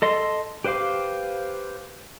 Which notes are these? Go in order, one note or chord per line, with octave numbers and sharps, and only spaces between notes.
A4 D#5 C6
G4 B4 C5 F5 D6